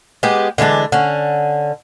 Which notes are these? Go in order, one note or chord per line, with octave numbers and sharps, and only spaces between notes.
G#3 B3 G4
D3 E3 G#3 D4
D3 C#4